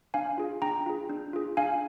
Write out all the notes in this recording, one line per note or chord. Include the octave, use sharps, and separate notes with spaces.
D4 F5 G#5
F4 G#4
D4 G5 A#5
F4 G#4
D4
F4 G#4
D4 F5 G#5